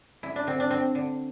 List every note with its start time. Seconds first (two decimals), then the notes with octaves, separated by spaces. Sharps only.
0.23 D3 E4
0.36 D4
0.47 D3 C4
0.60 D4
0.71 D3 C4
0.95 D3